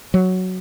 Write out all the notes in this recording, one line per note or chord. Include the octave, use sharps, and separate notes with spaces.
F#3